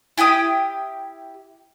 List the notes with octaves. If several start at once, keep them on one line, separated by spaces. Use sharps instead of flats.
E4 G4 G5 D#6